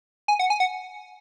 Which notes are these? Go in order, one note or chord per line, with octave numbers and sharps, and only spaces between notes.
G#5
F#5
G#5
F#5